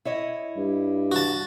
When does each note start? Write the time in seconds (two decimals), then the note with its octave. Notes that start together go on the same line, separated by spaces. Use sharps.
0.05 E4 C#5 D#5
0.57 G2
1.12 F#4 A5